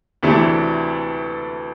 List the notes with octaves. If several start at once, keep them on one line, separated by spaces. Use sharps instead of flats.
D2 C3 E3 A3 D4